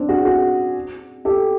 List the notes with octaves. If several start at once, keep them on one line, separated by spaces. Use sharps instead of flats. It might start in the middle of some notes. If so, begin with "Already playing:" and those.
Already playing: C4 D4
F#4 G#4
F#4 G#4
G4 A4